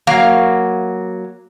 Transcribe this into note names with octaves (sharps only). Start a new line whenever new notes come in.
F#3 A#3 F5